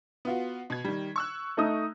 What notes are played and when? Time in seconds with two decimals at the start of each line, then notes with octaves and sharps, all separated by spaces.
0.25 B3 F4 F#4
0.70 B2 G#6
0.84 D#3 G3
1.16 C#6 E6 F#6
1.57 A3 D#4 D#6